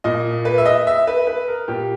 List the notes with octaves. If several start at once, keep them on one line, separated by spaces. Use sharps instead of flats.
A#2 D#5
B4
E5
D#5
E5
B4
B4
A#4
A#2 G4